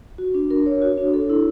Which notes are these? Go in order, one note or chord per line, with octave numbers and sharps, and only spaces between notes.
F#4
D4
A#4
C#5
F#4
D4
A4
E4